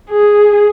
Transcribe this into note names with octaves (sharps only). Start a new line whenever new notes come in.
G#4